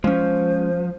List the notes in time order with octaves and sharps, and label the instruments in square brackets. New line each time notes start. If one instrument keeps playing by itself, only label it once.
[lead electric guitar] F3 [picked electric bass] G#3 C#4 [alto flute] C5